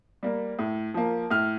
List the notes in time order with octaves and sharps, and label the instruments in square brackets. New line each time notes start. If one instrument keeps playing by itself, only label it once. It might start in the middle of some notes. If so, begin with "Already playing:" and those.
[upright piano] G3 A#3
A2
F3 A#3
A2 F6